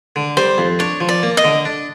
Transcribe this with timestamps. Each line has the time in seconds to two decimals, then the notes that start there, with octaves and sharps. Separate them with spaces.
0.16 D3
0.37 G3 C5
0.58 F2
0.79 D4 C#5
1.01 F3
1.09 D5
1.23 A#3
1.37 D#5
1.44 D3
1.65 D4